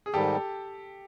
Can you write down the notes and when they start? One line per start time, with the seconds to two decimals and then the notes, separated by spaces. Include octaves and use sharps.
0.06 G#4
0.14 G#2 D#3 G3 G4 A4